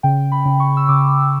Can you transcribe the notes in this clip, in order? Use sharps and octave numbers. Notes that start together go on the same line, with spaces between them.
C#3 G5
B5
C#3
C#6
E6
C#3 D6